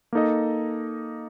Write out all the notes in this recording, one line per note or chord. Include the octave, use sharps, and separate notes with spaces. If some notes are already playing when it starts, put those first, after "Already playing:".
A#3 D#4 A4 D#5